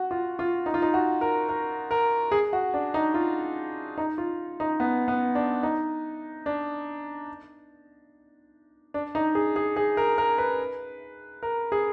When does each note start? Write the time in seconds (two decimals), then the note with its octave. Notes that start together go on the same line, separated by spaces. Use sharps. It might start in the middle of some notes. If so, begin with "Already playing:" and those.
Already playing: F#4
0.11 F4
0.39 F4
0.66 D#4
0.74 F4
0.82 D#4
0.94 F#4
1.21 A#4
1.49 A#4
1.91 A#4
2.32 G#4
2.53 F#4
2.74 D4
2.94 D#4
3.14 F4
3.98 D#4
4.18 F4
4.60 D#4
4.80 B3
5.08 B3
5.35 D4
5.63 D#4
6.46 D4
8.94 D4
9.15 D#4
9.35 G#4
9.56 G#4
9.76 G#4
9.97 A#4
10.18 A#4
10.38 B4
11.43 A#4
11.72 G#4